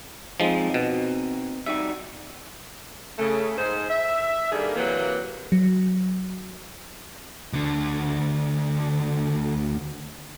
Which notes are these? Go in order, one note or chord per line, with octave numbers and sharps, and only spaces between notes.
F3 G#3 C4 D#4
B2
G3 D#4 F#4 E5
C#3 A3
G#2 G#4 C5
E5
D#3 G3 A#3 D4 G#4 A4
C3 E3 F#3 A#3
F#3
D2 D3